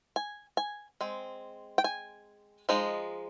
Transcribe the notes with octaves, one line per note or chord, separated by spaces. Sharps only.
G#5
G#5
G#3 C4
G5
G#5
F3 G#3 D#4